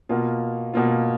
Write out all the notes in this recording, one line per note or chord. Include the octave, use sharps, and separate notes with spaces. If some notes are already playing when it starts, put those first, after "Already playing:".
B2 A#3 F4
B2 A#3 F4